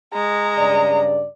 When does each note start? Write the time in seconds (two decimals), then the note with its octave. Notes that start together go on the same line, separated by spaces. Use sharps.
0.14 G#3 A#5
0.57 G2 C#3 D5